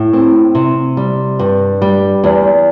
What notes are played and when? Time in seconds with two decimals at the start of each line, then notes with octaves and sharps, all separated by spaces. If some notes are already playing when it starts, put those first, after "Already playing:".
Already playing: A2
0.13 C4
0.55 C3
0.97 G3
1.39 G2
1.82 G3
2.24 E2